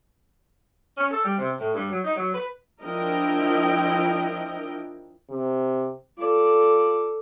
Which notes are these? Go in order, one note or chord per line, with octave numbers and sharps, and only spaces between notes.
C#4
A4
G3
C3
A2
G2
F#3
D#4
F#3
B4
F3 D4 E4 A#4 D#5 G5
C3
F4 A4 D5